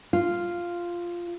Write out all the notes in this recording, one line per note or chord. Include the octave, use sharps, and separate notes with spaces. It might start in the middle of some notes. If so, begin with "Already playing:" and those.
F4